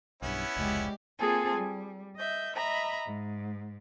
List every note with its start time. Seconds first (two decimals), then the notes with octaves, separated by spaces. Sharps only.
0.22 B1 G2 B3 C#4 E4
0.57 F1 C#2 G#3 G4 D5
1.18 A#3 C4 F4 G#4 A4 G#5
1.55 G3
2.17 D#5 E5 G6
2.55 D#5 E5 A#5 B5
3.05 G#2